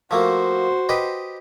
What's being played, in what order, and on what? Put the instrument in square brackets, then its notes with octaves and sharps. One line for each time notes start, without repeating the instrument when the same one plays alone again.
[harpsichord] F3 A3 A#3 [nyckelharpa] F#4 C5
[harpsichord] G4 B4 D#5